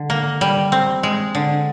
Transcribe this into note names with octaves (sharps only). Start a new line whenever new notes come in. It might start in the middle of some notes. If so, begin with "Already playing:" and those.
Already playing: D3
A#3
G3
C4
G#3
D3